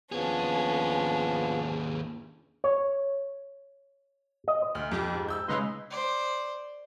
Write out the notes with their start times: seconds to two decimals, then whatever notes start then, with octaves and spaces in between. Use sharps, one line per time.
0.12 D#2 F3 B3 C#4 D4 G#4
2.64 C#5
4.48 D#5
4.75 D2 F6
4.92 F2 G4
5.13 G#2
5.29 E6 G6
5.48 C#3 G#3 D#4 B4 D#5 C6
5.91 C5 D5